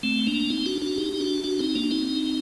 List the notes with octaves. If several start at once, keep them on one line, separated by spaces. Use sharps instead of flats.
A3 C4
A#3 D4
C4 D#4
D4 F#4
D4 F#4
D#4 G4
D#4
D4 F#4
D4 F#4
C4 D#4
A#3 D4
C4 D#4